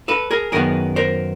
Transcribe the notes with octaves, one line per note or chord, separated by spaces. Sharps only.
A4 B4
G#4 A#4
F#2 D#3 F#3 B3 G#4 A#4
A#4 C5